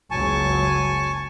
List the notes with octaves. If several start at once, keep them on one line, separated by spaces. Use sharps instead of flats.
F#1 C#2 F#3 G#5 A5 C#6